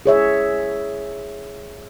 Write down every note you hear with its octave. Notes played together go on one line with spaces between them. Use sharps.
G#4 C#5 E5